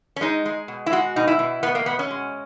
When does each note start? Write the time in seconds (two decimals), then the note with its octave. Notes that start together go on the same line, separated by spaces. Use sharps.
0.16 C#4
0.21 G#3 D#4
0.45 G#3
0.68 B2
0.86 E4
0.92 G#3 F#4
1.16 B2 D#4
1.28 E4
1.39 B2
1.63 B2 B3
1.75 A#3
1.86 B2 B3
1.99 C#4
2.11 G#3